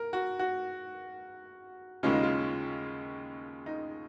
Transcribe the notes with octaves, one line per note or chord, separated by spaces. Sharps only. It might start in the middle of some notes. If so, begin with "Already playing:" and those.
Already playing: A#4
F#4
F#4
D#2 C#3 G#3 C#4 F4
D#4
F4
D#4